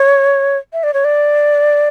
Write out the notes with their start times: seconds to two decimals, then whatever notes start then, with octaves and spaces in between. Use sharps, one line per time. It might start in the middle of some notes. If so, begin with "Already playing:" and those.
Already playing: C#5
0.73 E5
0.83 D5
0.94 C#5
1.05 D5